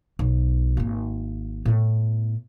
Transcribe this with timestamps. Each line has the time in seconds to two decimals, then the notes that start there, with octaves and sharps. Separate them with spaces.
0.19 B1
0.77 G#1 A#3
1.65 A2 B3